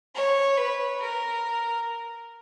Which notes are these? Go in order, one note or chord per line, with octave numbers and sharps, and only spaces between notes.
C#5
B4
A#4